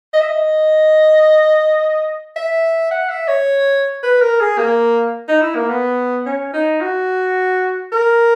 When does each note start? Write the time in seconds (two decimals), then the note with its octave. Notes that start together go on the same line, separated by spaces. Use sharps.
0.13 D#5
0.21 E5
0.28 D#5
2.36 E5
2.91 F#5
3.09 E5
3.28 C#5
4.03 B4
4.21 A#4
4.40 G#4
4.58 A#3
5.28 D#4
5.42 E4
5.55 A#3
5.69 B3
6.26 C#4
6.53 D#4
6.81 F#4
7.92 A#4